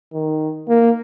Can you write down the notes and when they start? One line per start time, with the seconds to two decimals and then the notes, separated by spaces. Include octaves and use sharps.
0.14 D#3
0.69 A#3